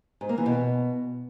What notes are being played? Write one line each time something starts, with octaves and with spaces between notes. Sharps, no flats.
G#2
A#3
E3
B2